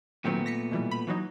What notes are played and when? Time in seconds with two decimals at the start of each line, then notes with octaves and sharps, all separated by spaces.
0.25 A#2 D#3 F#3 A3 B3 C4
0.46 A#6 B6 C#7
0.71 B2 E3 G3
0.91 B5
1.07 E3 F#3 D#4